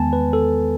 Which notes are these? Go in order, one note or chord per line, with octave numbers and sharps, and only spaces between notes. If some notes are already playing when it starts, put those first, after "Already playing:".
Already playing: E2 D#3 G#3 B3 G#5 A5
B4
A4